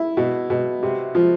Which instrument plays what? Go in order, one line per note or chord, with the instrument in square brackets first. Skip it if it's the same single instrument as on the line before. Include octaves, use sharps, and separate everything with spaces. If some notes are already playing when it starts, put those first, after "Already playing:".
Already playing: [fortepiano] E4
B2
B2
C3
F3